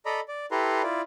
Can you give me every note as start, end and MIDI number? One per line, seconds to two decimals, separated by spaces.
0.06 0.20 69
0.06 0.20 74
0.06 0.20 75
0.06 0.20 82
0.06 0.20 83
0.28 0.46 74
0.51 0.82 64
0.51 0.82 67
0.51 0.82 69
0.51 0.82 71
0.51 0.82 82
0.51 0.82 84
0.83 1.01 64
0.83 1.01 65
0.83 1.01 74